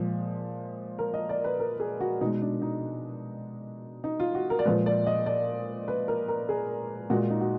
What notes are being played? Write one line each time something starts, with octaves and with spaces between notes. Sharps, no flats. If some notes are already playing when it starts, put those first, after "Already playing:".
Already playing: A#2 F3 G#3
A#4
D#5
D5
B4
A#4
G#4
F#4
B2 G#3 D#4
D4
D#4
D#4
F4
F#4
A#4
D5
A#2 F3 G#3 B4
D5
D#5
D5
B4
A#4
A#4
G#4
A#2 G#3 F#4
D#4
F#4